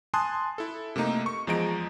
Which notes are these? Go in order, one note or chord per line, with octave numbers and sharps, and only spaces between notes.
G#5 A5 C6 D#6 F#6
E4 A4
C3 A3 A#3 D#4
C#6
E2 F3 G#3 D#5 A#5 D7